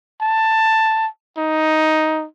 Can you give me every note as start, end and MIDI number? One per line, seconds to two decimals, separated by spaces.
0.21 1.07 81
1.37 2.25 63